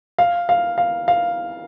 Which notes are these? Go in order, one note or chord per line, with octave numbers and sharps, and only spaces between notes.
F5
F5
F5
F5